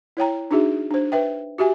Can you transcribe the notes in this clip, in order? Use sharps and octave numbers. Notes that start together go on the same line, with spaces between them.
E4 C#5 G5 A#5
D4 D#4 F#4 G#4 E5
D4 C5
B4 E5 G5
F#4 G4 E5 G#5